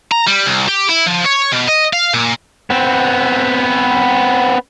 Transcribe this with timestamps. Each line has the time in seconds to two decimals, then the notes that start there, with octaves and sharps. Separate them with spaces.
0.12 A#5
0.27 G3
0.46 C2
0.68 G4
0.89 E4
1.06 F3
1.25 C#5
1.52 B2
1.68 D#5
1.93 F5
2.14 A#2
2.70 B3 C4